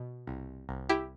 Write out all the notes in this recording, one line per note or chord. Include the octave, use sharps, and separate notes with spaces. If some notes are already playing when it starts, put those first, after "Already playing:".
Already playing: B2
C2
C2
E4 G4